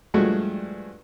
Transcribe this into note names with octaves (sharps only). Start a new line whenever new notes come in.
G2 F3 G#3 A3 F#4